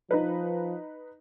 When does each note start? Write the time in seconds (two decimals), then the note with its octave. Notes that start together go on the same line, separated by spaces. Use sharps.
0.11 F3 D#4 B4